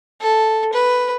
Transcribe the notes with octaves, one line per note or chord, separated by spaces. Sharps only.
A4
B4